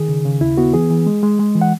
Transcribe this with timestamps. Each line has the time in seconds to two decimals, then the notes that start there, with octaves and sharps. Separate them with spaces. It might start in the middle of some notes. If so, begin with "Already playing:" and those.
Already playing: D#3 G#4
0.08 C#3
0.25 C#3
0.41 D#2 E4
0.57 B3 F#4
0.74 E3 G#4
0.90 E3
1.07 G#3
1.23 G#3
1.39 G#3
1.55 E3
1.61 F#5